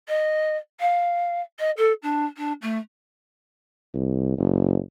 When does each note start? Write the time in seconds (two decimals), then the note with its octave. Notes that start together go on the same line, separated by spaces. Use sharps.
0.08 D#5
0.80 F5
1.59 D#5
1.77 A4
2.02 D4
2.37 D4
2.62 A3
3.94 C2
4.38 F#1